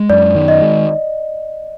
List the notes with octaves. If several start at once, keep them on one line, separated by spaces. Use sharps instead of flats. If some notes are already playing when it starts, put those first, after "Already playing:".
Already playing: G#3
F#2 D5
D#3
D#5
G#3